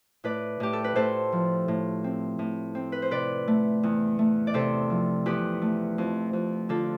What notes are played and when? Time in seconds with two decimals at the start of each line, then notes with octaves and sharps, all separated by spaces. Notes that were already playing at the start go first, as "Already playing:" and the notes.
0.24 A2 B4 D5
0.60 A2 G4
0.73 A4
0.84 B4
0.96 A2 A4 C5
1.32 F3
1.68 A2
2.04 C4
2.39 A2
2.75 C4
2.92 B4
3.02 C5
3.11 C3 B4 D5
3.48 A3
3.83 E2
4.19 A3
4.47 D5
4.54 C3 A4 C5
4.90 F3
5.26 E2 G4 B4
5.62 A3
5.98 F2
6.33 F2
6.69 D3 F4 A4